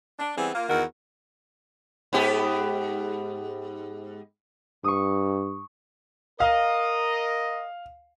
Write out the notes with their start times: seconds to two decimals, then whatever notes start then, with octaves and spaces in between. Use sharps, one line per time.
0.19 D4
0.37 E3 G3 B3 C4 G#4
0.55 A#3 F4
0.69 E2 D#3 F#4 A#4
2.13 G#2 B3 G4
4.84 G2 C#6 D#6
6.40 A#4 D#5 F5